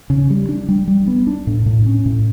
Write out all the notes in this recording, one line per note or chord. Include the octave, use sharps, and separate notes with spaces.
C#3
G3
D4
G3
G3
B3
D4
A2
A2
C#4
A2